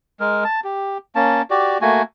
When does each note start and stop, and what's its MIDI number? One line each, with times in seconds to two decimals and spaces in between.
0.20 0.44 56
0.20 0.44 70
0.44 0.60 81
0.64 0.98 67
1.15 1.42 58
1.15 1.42 61
1.15 1.42 81
1.50 1.78 66
1.50 1.78 67
1.50 1.78 74
1.81 2.02 57
1.81 2.02 58
1.81 2.02 66
1.81 2.02 80